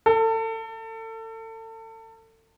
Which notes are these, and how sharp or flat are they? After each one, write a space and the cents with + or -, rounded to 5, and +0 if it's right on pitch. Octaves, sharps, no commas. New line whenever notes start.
A4 +30